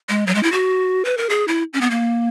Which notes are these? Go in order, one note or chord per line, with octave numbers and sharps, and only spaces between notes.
G#3
F#3
G#3
E4
F#4
B4
A#4
G#4
E4
C#4
B3
A#3